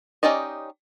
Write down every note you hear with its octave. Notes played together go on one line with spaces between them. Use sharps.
C#4 D#4 G4 D5 D#5